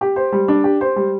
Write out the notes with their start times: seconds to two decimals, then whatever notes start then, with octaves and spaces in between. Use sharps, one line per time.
0.01 G4
0.16 C5
0.32 G3
0.48 D4
0.64 G4
0.81 C5
0.96 G3